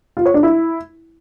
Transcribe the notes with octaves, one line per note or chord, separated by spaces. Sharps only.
F4
C#5
D4
E4